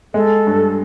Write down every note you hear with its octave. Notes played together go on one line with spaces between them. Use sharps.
G#3 A4
G2